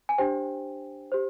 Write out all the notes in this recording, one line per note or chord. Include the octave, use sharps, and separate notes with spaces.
G#5
D4 G4 C5 G5
G4 C5